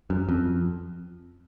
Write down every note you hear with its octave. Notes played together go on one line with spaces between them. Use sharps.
F#2
F2